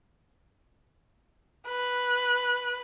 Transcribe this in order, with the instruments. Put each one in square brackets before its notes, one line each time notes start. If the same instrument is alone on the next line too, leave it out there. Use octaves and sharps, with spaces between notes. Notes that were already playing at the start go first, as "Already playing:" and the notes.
[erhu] B4